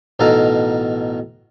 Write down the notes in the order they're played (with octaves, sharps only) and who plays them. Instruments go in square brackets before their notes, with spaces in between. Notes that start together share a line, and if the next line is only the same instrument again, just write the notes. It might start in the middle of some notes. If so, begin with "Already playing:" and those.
[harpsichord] A1 B2 D#4 A4 F5 A#5